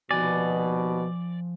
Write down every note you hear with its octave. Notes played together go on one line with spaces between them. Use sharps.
D#2 B2 F3 D5 G#5